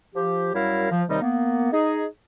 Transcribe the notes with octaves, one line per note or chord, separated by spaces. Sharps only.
F3 G4
F#2 F#3 G3 E4 A#4 F5
F3
D#2 C3 D#3 G3 D#4 D#5
A#3 B3
D#4 G#4